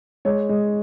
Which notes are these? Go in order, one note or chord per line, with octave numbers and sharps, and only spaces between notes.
G#3 C#5
G#3